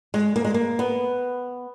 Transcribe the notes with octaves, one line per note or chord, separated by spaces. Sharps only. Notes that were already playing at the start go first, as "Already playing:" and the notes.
G#3
A#3
G#3
A#3
B3